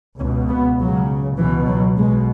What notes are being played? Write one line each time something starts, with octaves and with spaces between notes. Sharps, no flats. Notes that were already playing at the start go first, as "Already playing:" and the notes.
C#2 B2 C#4
B3
C#2 C#3 F#3
C#2 B2 E3
F#3
B1 B2 G#3